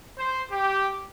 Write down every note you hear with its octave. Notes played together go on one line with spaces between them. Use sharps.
C5
G4